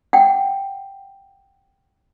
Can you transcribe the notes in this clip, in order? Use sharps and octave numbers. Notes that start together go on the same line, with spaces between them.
F#5 G5